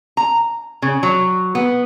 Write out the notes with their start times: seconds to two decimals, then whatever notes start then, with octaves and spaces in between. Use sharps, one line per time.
0.17 A#5
0.82 C#3
1.03 F#3
1.55 B3